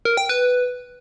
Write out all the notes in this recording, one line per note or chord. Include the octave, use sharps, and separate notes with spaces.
A#4
G5
B4